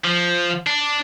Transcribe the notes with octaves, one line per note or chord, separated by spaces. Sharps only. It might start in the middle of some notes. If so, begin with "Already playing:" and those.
F3
D4